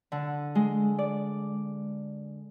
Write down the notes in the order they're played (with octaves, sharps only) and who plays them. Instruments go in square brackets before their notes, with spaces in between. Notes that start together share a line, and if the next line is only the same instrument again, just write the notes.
[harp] D3
G#3
D5